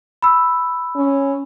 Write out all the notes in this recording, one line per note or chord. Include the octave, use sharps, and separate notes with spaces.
B5 E6
C#4